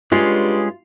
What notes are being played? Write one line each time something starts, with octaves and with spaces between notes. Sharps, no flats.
G2 G#3 C#4 F4 G#4